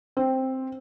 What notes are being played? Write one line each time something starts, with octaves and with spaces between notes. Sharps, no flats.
C4